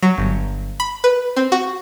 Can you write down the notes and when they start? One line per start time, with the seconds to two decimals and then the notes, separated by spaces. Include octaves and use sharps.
0.02 F#3
0.18 G1
0.80 B5
1.04 B4
1.36 C4
1.52 F#4